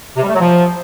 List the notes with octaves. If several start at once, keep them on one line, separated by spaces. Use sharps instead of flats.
C3
G3
A3
F#3
F3